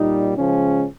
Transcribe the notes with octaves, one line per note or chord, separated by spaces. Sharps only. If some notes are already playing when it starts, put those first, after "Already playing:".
Already playing: A#2 G3 D#4
C#3 F3 G#3 C#4